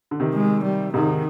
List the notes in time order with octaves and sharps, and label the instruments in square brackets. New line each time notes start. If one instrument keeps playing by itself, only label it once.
[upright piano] D3
C3 D#3
[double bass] G#3
G3
[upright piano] G#2 C3 [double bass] D#3